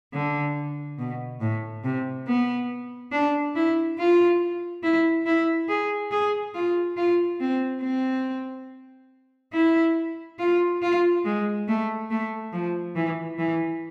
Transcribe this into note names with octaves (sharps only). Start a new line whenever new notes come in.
D3
B2
A2
C3
B3
D4
E4
F4
E4
E4
G#4
G#4
F4
F4
C4
C4
E4
F4
F4
G#3
A3
A3
F3
E3
E3